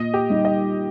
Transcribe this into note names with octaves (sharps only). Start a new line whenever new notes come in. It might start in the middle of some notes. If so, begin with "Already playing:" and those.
Already playing: A#2 D#5
G4
G3 D#4
D#5